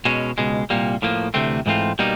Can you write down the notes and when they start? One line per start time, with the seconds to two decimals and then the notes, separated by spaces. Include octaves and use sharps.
0.05 B2 G#3 C#4
0.38 C#2 B2 G#3
0.70 C2 A#2 G3 A#3
1.02 A2 F3 A#3
1.34 D2 C3 E3 A3 C4
1.66 G#2 E3 A3 C4 F4
1.99 B2 G3 A#3 D#4